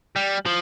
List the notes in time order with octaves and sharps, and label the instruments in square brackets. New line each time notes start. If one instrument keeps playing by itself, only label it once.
[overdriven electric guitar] G3
F3